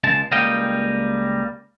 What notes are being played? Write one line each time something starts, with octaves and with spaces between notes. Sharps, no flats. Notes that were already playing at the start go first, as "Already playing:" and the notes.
C#2 C#3 G#3 A5
C#2 G3 A#3 D#5 F5 G5